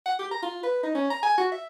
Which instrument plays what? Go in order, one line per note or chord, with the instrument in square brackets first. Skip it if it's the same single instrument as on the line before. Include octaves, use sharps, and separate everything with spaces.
[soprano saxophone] F#5
G4
A#5
F4
B4
D#4
C#4
A#5
G#5
F#4
E5